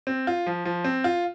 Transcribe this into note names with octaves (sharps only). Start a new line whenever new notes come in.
C4
F4
F3
F3
C4
F4